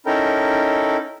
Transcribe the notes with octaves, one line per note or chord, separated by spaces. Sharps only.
C#4 D#4 E4 A4 A#4 G5